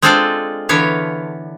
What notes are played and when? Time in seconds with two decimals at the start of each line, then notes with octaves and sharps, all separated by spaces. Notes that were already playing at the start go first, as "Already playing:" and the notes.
0.02 G#3 C4 D4 F4 A4 D5
0.69 D3 E3 B3 C#5 F5